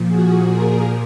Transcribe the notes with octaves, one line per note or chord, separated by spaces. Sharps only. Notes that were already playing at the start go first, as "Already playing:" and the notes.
Already playing: A#2 F3
F#4 G#4
G#4 A#4